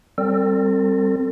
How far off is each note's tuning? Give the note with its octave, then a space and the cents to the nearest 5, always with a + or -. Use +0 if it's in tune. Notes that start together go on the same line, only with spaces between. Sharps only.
G3 +0 C4 +10 A4 +40